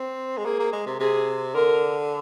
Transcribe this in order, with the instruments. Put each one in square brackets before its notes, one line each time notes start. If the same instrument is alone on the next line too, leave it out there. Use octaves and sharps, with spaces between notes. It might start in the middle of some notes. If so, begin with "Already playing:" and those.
Already playing: [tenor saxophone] C4
G#3
[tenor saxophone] A#3 [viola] G#4
[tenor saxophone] A#3
G#3
C3
[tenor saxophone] C3 [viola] G#4
[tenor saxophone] D3 [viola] A#4